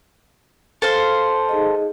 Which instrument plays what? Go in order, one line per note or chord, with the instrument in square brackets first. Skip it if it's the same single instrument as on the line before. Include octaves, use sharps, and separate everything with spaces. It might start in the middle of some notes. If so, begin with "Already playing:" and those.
[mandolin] A4 C5 F5
[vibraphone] D#4 G#4 D#5